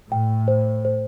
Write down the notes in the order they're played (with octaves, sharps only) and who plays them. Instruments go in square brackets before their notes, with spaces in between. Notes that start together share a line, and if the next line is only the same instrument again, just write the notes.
[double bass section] A2 [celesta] G5
[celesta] C5
C5